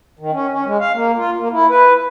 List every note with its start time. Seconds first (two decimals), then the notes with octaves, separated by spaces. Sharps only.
0.19 D#3
0.32 C#4
0.51 C#4
0.65 G#3
0.80 F5
0.93 A#3
1.16 F4
1.38 A#3
1.52 E4
1.70 B4